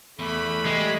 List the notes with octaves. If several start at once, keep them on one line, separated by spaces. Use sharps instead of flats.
E2 A3 B5
G3 G#3